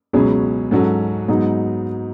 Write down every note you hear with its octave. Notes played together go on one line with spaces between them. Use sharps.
C#2 B2 F#3 C#4 G#4
G#2 F#3 C#4 F#4 A4
G#2 F#3 B3 D#4 G#4